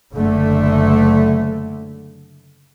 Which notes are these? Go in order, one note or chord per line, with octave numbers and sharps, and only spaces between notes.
F#1 D3 A3